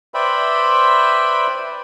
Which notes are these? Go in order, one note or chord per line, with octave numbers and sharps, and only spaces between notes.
B4 C5 D5 E5 G5 B5